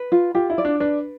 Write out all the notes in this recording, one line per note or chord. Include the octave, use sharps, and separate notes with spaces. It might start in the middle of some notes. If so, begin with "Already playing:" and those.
Already playing: B4
F4
F4 G4
E4
D5
D4
D4 B4